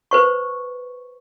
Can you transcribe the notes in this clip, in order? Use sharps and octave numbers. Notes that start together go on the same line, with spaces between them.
B4 C5 C#6